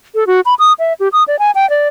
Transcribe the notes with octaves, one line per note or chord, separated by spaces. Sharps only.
A4
F#4
B5
D#6
E5
G4
D#6
D5
G#5
G5
D5